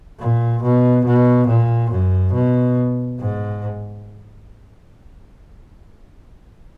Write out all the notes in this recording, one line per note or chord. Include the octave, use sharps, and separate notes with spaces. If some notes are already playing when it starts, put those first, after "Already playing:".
A#2
B2
B2
A#2
F#2
B2
G#2